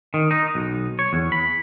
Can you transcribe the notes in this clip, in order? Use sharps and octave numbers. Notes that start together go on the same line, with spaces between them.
D#3
D#4
B1
C#5
E2
B5